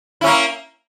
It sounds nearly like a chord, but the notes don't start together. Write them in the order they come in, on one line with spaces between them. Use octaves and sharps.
E4 C#4 A#3